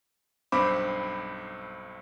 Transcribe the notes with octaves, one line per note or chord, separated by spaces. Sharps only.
B1 G2 C4 C5 B5 D6